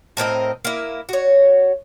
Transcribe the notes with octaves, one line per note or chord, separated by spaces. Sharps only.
A2 C4 A#4 D#5
A#3 E4
F#4 C#5